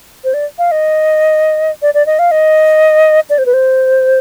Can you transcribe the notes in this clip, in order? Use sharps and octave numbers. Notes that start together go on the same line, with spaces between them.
C5
D5
F5
D#5
D5
D5
D#5
F5
D#5
D5
C5
B4
C5